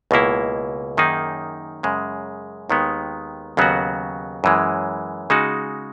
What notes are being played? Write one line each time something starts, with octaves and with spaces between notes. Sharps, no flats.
C#2 B2 A#3 E4
F#2 D#3 A#3 D#4 G#4
F#2 C#3 G#3
D#2 D#3 G#3 B3
D#2 C#3 F#3 B3 F#4
F#2 E3 G#3
C#3 G#3 D#4 F#4